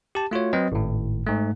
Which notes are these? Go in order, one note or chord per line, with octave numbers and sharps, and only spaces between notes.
G4 A5
A3 F4 F#4 C#5
F#3 C4 B4 D#5
G#1 A2
G#2 A3